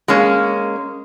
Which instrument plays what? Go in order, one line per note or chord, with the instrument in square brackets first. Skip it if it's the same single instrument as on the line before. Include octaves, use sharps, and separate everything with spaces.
[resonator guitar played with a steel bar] G#3 A#3 C#4